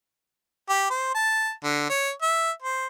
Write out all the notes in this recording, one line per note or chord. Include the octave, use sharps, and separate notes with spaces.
G4
C5
A5
D3
C#5
E5
C5